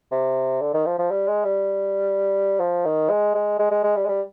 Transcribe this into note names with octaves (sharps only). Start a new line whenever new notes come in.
C3
D3
D#3
F3
F3
G3
G#3
G3
F3
D#3
G#3
G#3
G#3
G#3
G#3
G3
G#3
G3